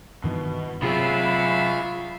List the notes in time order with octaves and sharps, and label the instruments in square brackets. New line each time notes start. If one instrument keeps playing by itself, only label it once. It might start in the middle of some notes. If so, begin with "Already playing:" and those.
[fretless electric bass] G2 D#3 E3 [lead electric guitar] B2
[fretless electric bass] C3 [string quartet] F#3 E5 F5 [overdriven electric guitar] F4 G#4 [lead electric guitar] B5